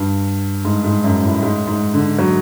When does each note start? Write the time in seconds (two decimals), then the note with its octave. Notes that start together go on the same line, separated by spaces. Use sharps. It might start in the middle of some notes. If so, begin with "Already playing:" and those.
Already playing: G2
0.65 G#2
0.84 G#2
1.04 F#2
1.24 A2
1.43 G#2
1.67 G#2
1.94 D3
2.19 F#3